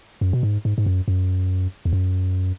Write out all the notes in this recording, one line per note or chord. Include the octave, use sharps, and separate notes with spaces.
F#2
B2
G#2
G#2
G#2
F#2
F#2
E2
F#2